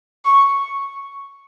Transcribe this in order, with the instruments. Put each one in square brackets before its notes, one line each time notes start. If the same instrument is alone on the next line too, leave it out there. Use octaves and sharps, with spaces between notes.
[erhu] C#6